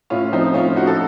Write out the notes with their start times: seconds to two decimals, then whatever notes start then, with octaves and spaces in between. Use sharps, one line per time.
0.10 A2 C#4 F4
0.32 F3 C4 D#4
0.54 A2 C#4 F4
0.76 F3 D#4 F#4
0.87 A4